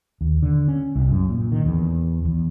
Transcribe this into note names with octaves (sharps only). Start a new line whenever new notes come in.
D#2
D3
C#4
C2
F#2
A#2
D#3
E2
E2